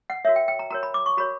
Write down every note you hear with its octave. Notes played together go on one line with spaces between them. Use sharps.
F#5
F#4 A#4 C#5 E5
G5
G5
A#5
F#4 A#4 C#5 A#5
B5
D6
C#6
F#4 A#4 C#5 B5